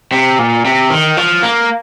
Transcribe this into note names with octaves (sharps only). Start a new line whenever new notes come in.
C3
A#2
C3
D#3
F3
A#3